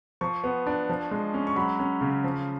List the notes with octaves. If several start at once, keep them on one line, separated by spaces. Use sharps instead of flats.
F3 C#6
B3
D4
F3
G#3
C#4
C#6
F#3 B5
C#4
C#3
F3